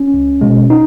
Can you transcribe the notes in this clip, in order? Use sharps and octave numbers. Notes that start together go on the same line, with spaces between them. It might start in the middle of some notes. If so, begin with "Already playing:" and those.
Already playing: C#4
C#2
B2 G#3
D#4